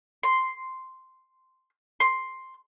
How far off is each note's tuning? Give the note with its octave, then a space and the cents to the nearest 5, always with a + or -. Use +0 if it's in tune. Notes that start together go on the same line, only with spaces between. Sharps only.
C6 -5
C6 +5